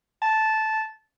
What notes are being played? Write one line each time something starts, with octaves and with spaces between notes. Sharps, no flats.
A5